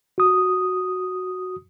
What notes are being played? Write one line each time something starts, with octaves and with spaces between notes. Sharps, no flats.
F#4 D#6